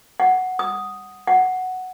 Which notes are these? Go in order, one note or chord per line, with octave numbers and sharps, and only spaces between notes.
F#5
D#6
F#5